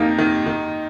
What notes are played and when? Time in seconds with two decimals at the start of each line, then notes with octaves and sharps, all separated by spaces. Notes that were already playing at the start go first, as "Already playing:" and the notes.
Already playing: F2 A#3 D#4 G4
0.18 D#3
0.46 D#3